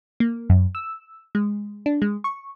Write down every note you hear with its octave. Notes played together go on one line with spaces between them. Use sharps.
A#3
F#2
E6
G#3
D4
G#3
C#6